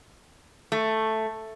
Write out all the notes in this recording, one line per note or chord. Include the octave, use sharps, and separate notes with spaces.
A3